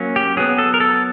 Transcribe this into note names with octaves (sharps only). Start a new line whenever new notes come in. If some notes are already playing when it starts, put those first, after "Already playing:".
Already playing: F#3 A#3 C#4
G4
F#3 B3 G#4
A4
A#4
A4